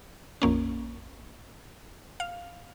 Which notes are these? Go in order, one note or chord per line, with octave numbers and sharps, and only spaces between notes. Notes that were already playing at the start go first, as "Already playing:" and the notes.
A#1 F2 A#3 C#4
F5